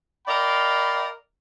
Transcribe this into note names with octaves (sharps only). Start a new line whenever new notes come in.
A#4 D5 D#5 F5 G5 B5